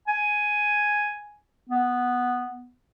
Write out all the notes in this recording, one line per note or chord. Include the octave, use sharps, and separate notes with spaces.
G#5
B3